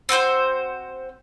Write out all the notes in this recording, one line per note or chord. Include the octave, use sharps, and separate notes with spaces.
C4 F#4 B4 C5